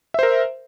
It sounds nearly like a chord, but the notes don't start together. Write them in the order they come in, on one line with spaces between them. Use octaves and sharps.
E5 C5 A#4